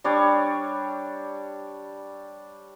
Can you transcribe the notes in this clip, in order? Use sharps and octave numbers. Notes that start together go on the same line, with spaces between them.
G3 D4 C#5